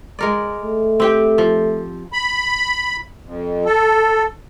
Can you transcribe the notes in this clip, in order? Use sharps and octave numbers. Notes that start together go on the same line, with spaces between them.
G#3 A#4 D5
A3
C4 G4 G5
F3
B5
F2
A4